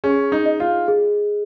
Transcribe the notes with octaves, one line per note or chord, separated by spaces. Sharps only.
C#4 G#4
D#4
D#5
F4
G#4